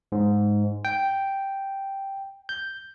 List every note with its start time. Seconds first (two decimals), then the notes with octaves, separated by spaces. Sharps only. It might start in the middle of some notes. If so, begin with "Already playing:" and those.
0.12 G#2
0.85 G5
2.49 G6